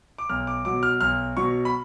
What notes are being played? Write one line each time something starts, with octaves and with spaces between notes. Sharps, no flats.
D6
B1 F6
D6
B2 F#3 D6
F6
B1 F6
B2 F#3 C#6
B5